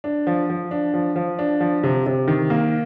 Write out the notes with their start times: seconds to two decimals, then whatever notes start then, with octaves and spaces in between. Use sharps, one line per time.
0.04 D4
0.27 F3
0.50 F3
0.71 D4
0.94 F3
1.16 F3
1.39 D4
1.60 F3
1.83 C3
2.06 C3
2.28 D#3
2.50 A#3